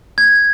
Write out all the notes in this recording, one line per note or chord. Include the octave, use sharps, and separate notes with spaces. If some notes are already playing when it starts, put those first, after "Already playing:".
G#6